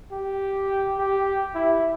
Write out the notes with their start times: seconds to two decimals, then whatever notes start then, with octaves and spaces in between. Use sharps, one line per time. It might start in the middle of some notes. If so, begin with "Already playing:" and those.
0.12 G4
0.98 G4
1.55 E4